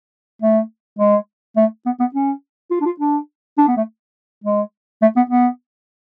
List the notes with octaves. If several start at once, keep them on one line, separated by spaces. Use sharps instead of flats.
A3
G#3
A3
B3
B3
C#4
F4
D4
F4
D4
D4
B3
A3
G#3
A3
B3
B3